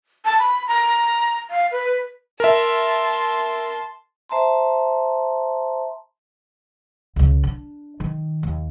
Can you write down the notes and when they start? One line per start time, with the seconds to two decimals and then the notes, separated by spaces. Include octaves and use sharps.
0.25 A5
0.39 B5
0.67 A#5
1.50 F5
1.71 B4
2.40 A#4 E5 A5 C6
4.29 C5 E5 A5 A#5 C6
7.16 C#2 C#3
7.43 D4
8.00 D#3
8.43 D#2